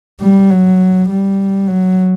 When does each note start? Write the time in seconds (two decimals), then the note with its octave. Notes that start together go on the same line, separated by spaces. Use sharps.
0.21 G3
0.50 F#3
1.09 G3
1.68 F#3